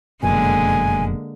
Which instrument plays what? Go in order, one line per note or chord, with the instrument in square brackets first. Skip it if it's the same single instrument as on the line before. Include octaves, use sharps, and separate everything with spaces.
[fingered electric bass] F1 F#2 B2 [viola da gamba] D3 G#3 A#3 [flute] G#5